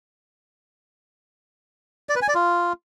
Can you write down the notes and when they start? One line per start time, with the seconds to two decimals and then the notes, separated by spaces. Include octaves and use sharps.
2.09 D5
2.16 B4
2.22 G#5
2.28 D5
2.35 F4